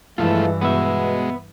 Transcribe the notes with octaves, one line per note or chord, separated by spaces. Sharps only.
G2 E3 F3 G#3 A3 E4 F4 A4
B2 G#3 B3 E5